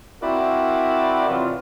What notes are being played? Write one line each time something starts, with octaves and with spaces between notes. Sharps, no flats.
C4 E4 F#4 A#4 D5
C3 E3 F#3 F4